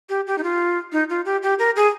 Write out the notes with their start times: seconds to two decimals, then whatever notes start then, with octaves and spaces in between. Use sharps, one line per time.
0.09 G4
0.27 G4
0.38 D#4
0.43 F4
0.92 D#4
1.10 F4
1.25 G4
1.43 G4
1.59 A#4
1.76 G#4